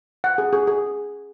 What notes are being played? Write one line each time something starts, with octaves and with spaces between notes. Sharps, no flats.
F#5
G#4
G#4
G#4